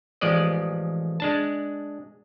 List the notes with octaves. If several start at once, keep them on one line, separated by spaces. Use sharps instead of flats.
A1 F3 G#3 D5 D#5
G#3 D4 A5